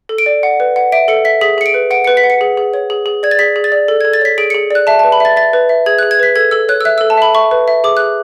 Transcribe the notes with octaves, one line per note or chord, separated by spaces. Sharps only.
A4
D7
D5
F#5
B4
F#5
E5 D7
A4 C#7
E5 B6
G#4 B6
G#4 C#7
D7
B4
F#5 D7
B4 C#7
B6
F#5
C#7
G#4
G#4
C#5
G#4
G#4
D5 G#6
A6
G#4 B6
G#4
A6
D5
A4
G#6
A4
A6
C#5 B6
G#4 D7
C#7
G#4
D5 F#6
E5 A5
A5
B4
B5
E5 A6
E5 A6
B4
E5
G#4 G#6
F#6
G#4
G#6
B4 B6
A4 G#6
A4 E6
C#5 F#6
E6
E5 F#6
A4 E6
A5
E5 B5
E5 C#6
B4
E5
G#4 D6
G#4 F#6